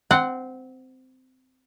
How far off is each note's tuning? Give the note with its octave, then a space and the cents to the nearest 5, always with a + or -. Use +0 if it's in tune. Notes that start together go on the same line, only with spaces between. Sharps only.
C4 -15 F#5 +5